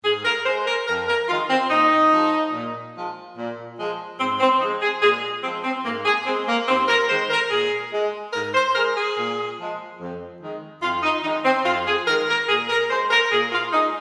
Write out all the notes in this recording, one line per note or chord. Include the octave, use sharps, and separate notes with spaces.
G#2 G#4
A#4
G#3 C5
A#4
F2 A#4
A#4
D#3 G#3 F4
C4
A#2 D#4
F3 G#3
A#2
F3 G#3
A#2
F3 G#3
G#2 C4
C4
F3 G#3 D#4
G#4
A#2 G#4
F3 G#3 C4
C4
G#2 A#3
G#4
G#3 C4
A#3
D#2 C4
A#4
D#3 G#3 C5
A#4
A#2 G#4
G#3
G#2 A#4
C5
G#3 A#4
G#4
A#2
F3 G#3
F2
D#3 G#3
F2 F4
D#4
D#3 G#3 D#4
C4
F2 F4
G#4
D#3 G#3 A#4
A#4
A#2 G#4
A#4
G#3 C5
A#4
A#2 G#4
F4
G#3 D#4